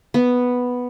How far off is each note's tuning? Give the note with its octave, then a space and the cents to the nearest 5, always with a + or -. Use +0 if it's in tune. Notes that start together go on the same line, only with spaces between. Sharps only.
B3 +0